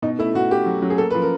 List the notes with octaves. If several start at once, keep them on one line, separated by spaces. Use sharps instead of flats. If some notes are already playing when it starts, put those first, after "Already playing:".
B2 D#4
A3 E4
B2 F#4
A3 G4
F#3
F#3
G#4
A#3 A4
F3 B4
A#4